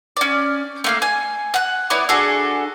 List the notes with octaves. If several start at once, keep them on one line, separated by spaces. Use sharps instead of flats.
C#4 D5
A3 A#3 F5
G#5
F#5 F#6
B3 E4 C#5 D5
D4 F#4 G#4 A4